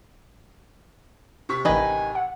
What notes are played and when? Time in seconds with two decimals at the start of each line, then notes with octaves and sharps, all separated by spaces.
1.49 C3 C#6 B6
1.65 A1 D#3 E3 B4 D#5 G#5
2.15 F#5